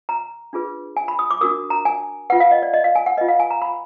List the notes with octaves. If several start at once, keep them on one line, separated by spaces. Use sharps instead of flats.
A#5
D4 F4 G#4 B4
G#5
B5
D#6
D6
D4 F#4 A#4 D#6
A#5
G#5
F4 B4 F#5
F5
D#5
D5
D#5
F5
G#5
F#5
F4 B4 D#5
F5
G#5
A#5
B5